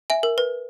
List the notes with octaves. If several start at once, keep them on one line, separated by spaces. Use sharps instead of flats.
E5 G#5
A#4
B4